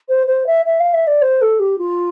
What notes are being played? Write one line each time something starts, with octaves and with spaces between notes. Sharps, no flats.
C5
C5
E5
E5
F5
E5
D5
C5
A4
G4
F4